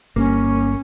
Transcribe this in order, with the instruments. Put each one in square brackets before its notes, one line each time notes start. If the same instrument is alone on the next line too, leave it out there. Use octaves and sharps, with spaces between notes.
[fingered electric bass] G1 [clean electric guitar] A#3 [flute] C#4